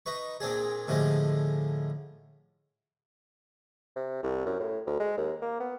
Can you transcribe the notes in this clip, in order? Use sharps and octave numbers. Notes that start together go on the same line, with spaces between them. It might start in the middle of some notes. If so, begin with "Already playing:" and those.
D#4 B4 C#6
A#2 C4 D4 G#4
A2 D3 F3 G3 G#3
C3
C2
F#2
A2
D2
G#3
D#2
A#3
B3